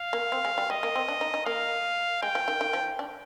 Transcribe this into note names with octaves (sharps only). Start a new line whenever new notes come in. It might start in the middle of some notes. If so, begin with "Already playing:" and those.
Already playing: F5
A#3
C4
G#3
G3
G3 D#5
A#3
C4
D4
D#4
D#4
A#3 F5
G#3 G5
F3
D#3
D#3
F3
D4